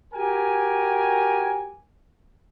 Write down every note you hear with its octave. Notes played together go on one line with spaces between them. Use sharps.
F#4 G4 A#4 G#5